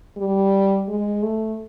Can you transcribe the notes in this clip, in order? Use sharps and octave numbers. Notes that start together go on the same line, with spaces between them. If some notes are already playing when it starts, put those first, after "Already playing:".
G3
G#3
A3